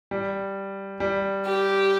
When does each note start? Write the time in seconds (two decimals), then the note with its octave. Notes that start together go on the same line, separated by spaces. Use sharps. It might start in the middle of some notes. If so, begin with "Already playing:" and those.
0.11 G3
1.00 G3
1.45 G4